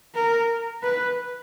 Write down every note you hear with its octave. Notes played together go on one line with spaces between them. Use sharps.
A#4
B4